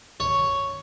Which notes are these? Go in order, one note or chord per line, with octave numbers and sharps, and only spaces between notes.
C#5